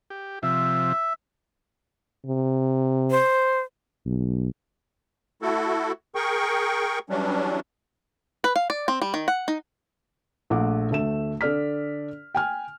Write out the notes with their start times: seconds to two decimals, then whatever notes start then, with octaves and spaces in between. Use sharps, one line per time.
0.10 G4
0.43 C3 F3 E5
2.26 C3
3.11 C5
4.06 B1
5.42 A3 E4 F#4 A4
6.15 G#4 A#4 G5 C#6
7.10 E3 F#3 G3 C#4 D4
8.44 B4
8.56 F5
8.70 D5
8.88 C4
9.02 G3
9.14 D#3
9.28 F#5
9.48 D#4
10.50 A#1 A3 F#5 D6
10.91 D2 A3 E5 E7
11.41 D3 A4 D5 F6 B6
12.35 G5 G#5 F6